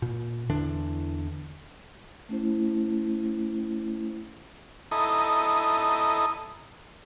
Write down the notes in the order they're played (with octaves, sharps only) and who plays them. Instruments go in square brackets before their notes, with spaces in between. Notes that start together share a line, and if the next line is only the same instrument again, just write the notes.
[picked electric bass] A#2
E2 D3 E3 D4
[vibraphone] A3 C#4 E4 C5
[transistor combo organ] E4 A4 D#5 A#5 B5 D#6